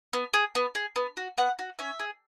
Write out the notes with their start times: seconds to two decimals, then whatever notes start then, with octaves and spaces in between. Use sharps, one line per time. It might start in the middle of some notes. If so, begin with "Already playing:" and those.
0.13 B3
0.34 G#4
0.55 B3
0.75 G#4
0.96 B3
1.17 F#4
1.38 B3 F#5
1.59 F#4
1.79 C#4 E5
1.99 G#4